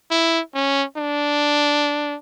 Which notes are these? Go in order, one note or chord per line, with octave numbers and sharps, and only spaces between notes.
E4
C#4
D4